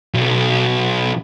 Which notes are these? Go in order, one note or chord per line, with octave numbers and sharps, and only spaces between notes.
B1